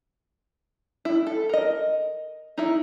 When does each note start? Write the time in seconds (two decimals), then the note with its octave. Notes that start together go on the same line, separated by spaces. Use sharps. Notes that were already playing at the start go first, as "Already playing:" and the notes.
1.05 E4
1.27 A4
1.49 A#4 D#5
2.58 D#4 E4